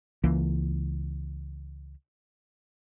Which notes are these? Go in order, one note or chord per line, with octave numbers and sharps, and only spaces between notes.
C#2 E3 A#3